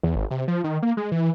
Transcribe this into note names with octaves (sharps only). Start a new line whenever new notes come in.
E2
G#1
C3
F3
D#3
A#3
G#3
E3